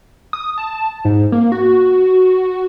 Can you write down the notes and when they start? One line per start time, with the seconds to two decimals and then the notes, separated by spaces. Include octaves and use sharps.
0.33 D#6
0.58 A5
1.05 G#2
1.32 A#3
1.52 F#4